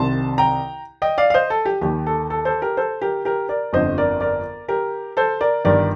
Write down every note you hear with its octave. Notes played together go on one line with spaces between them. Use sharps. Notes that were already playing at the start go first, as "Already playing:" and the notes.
Already playing: C2 C3 D#3 A5 C6
G5 A#5
D#5 G5
D5 F5
F5
C5 D#5
A4
G4
D#2 D#3 G4
A4
A4
A4 C5
G4 A#4
A4 C5
G4 A#4
G4 A#4
A#4 D5
G1 F2 D3 C5 D#5
A#4 D5
A#4 D5
G4 A#4
A4 C5
A#4 D5
G1 G2 D#3 A#4 D5